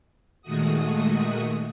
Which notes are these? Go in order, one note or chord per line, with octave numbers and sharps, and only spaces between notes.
A#2 D#3 G#3 A3 F#4 D#6